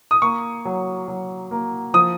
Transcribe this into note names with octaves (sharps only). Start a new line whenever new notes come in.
D#6
A#3 C#6
F#3
F#3
A#3
F3 D#6